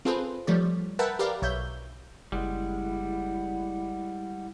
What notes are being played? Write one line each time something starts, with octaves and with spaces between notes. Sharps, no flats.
C4 F4 G#4 A4 B4 C5
F3 G3 A3 C#5 D5
A#4 B4 E5 F#5 G5 A5
G4 A#4 B4 D5 F5
B1 C#5 E5 G6
F#1 G3 G#3 E4 F#5